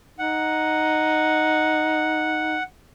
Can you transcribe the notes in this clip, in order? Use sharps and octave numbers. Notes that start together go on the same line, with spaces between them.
D#4 F#5